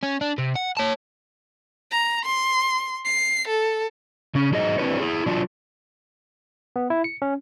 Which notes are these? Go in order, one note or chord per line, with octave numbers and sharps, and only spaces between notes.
C#4
D4
C3
F#5
C#5 A5
A#5
C6
C7
A4
C#3 C#4
F#3 D#4 G#4 D#5
C4 D4 E4 G4 B4 C#5
E4 G#4
F#3 D4 F4
B3
E4
C#7
C#4